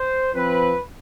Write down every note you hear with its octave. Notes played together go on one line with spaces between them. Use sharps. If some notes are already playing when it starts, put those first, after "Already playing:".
Already playing: C5
F3 C4 B4